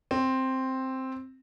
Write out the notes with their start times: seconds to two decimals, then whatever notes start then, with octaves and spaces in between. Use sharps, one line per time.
0.11 C4